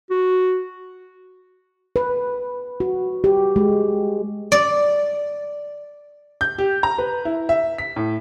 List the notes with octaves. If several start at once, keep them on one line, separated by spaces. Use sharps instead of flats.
F#4
B4
F#4
G4
G#3
D5
G6
G4
A#5
B4
E4
E5
B6
A2